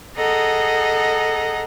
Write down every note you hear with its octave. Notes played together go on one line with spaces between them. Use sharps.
G#4 A4 D#5 F#5 A#5